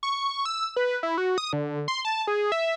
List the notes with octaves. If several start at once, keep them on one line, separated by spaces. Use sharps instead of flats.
C#6
E6
B4
E4
F#4
D#6
D3
C6
A5
G#4
E5